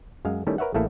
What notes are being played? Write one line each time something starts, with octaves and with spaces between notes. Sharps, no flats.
F#2 G#3 F5
D#3 G3 A3 C#4 E4
A#4 B4 C#5 E5 F#5
A1 A3 A#3 E4 G#4 A4